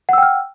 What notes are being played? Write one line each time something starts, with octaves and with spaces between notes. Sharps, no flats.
F#5 G5 E6 F6